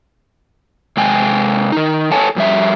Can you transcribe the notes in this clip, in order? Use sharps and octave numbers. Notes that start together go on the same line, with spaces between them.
C3 G#3 G5 G#5
D#3 D#4
A4 C#5 F#5 G#5 A5
F2 G3 E5